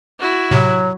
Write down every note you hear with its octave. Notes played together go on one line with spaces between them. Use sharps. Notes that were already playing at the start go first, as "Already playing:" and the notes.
E4 F#4
A2 C3 F#3